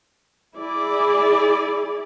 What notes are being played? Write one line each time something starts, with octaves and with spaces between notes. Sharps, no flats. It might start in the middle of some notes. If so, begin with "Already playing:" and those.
E4 G#4 D5